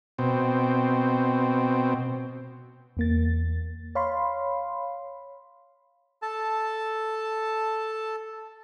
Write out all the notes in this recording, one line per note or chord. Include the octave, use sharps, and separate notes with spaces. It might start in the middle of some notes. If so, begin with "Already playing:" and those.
B2 C4
E2 A#3 A6
C#5 F5 B5 C6
A4 A5